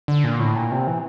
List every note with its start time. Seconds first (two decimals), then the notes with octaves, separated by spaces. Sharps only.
0.08 D3
0.24 A#2
0.40 A2
0.55 A#2
0.72 C3
0.87 E3